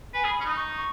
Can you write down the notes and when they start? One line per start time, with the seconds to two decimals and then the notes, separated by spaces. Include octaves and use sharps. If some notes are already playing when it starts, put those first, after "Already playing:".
0.14 B4 G#5
0.24 G#4
0.30 B5
0.40 C#4
0.45 D#4 D#6
0.56 C#6
0.77 C#6